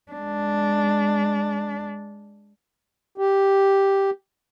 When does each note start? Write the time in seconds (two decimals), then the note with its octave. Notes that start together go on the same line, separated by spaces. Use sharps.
0.12 G#3 D4
3.18 G4